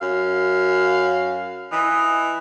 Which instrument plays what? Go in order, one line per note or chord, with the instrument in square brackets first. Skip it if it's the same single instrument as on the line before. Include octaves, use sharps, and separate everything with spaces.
[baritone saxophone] F#2 [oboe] F5
[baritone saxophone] E3 [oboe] D#5